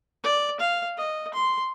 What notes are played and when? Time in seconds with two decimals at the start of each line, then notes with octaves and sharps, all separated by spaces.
0.24 D5
0.60 F5
0.98 D#5
1.34 C6